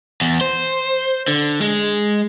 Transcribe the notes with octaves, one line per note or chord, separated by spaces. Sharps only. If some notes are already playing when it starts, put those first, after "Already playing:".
E2
C5
D3
G#3